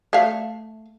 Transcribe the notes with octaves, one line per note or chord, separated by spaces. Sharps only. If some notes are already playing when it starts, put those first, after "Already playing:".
A3 F5